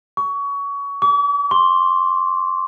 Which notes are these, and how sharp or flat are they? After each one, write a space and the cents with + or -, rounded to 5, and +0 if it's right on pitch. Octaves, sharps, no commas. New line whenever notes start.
C#6 +25
D6 -45
C6 +10